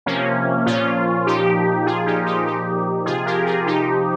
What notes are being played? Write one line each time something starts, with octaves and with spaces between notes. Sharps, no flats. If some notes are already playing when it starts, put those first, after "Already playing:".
C3 F3 A#3 C#4
A#2 F3 C#4 F4
A#2 F3 D#4 G4
A#2 F3 F4 G#4
D#4 G4
D#4 G4
A#2 F3 D#4 G4
C3 F3 F4 G#4
G4 A#4
F4 G#4
C3 F3 D#4 G4